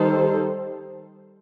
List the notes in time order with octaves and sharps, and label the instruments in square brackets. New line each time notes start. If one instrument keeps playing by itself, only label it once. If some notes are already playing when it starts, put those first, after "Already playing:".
Already playing: [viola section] D#3 G3 D#4 A4 C5